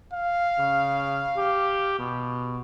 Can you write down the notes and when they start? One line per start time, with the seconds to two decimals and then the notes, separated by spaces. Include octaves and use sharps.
0.14 F5
0.58 C#3
1.37 G4
1.99 B2